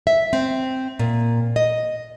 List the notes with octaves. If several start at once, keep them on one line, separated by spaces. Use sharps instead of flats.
E5
C4
A#2
D#5